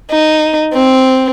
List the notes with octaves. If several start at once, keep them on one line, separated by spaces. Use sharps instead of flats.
D#4
C4